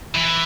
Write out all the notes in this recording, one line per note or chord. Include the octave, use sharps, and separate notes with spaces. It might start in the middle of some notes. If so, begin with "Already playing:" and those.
E3